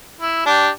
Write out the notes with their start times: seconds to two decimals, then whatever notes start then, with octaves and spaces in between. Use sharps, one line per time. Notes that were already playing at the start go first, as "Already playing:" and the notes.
0.21 E4
0.46 D4 G4